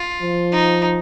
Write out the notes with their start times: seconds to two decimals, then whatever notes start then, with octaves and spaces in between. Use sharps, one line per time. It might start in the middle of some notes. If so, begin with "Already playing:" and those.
Already playing: F4
0.21 F3
0.52 D#4